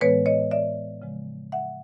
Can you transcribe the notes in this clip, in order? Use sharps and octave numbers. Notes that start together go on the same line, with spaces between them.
A2 E3 G#3 B3 B4 C#5
C#5 D#5
D5 E5
C#3 F3 G#3
E5 F#5